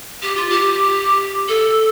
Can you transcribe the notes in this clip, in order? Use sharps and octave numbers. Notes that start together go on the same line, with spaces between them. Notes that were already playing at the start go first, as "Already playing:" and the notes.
G4
F4
G4
A4